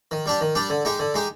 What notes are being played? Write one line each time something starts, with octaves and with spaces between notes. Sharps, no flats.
D#3
G3 D4 G4
D#3
G3 D4 G4
D3
G#3 D#4 G4
D3
G#3 D#4 G4